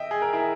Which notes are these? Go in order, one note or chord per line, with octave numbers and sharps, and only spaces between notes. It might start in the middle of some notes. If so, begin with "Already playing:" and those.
Already playing: D#5 E5 G5
G#4
A#4
E4 G#4